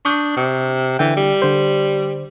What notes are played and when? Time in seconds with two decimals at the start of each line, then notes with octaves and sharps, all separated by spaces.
0.05 D4 C#6 D#6 G6
0.36 C3
0.99 D3 E3 G5
1.17 G3
1.42 D3 C5